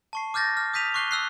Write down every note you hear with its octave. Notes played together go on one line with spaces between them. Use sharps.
A5 C#6 C7
D6 F6 G6 A6 A#6
F6
D#6 G6 B6 D#7 F7
C#6 D6 F#6 C7 G7
E6 F#6 C7